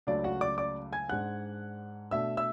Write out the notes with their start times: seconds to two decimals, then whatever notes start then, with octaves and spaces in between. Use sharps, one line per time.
0.07 C#2 C#3 F#3 A3 D4 D5
0.24 F#4 F#5
0.41 D5 D6
0.58 D5 D6
0.92 G#5 G#6
1.09 G#2 G#3 D4 F#5 F#6
2.11 B2 A3 D4 E5 E6
2.37 E5 E6